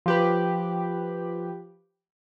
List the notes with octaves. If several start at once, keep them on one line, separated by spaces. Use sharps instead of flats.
F3 G4 B4